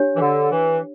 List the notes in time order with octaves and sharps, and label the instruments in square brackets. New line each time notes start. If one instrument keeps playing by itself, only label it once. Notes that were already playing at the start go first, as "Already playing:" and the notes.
Already playing: [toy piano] D4 G4 C#5
[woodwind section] E3
D3
E3